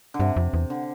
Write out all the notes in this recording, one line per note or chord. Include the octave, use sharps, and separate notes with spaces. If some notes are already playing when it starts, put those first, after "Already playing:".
D3
G2 C3
F2
E2
D3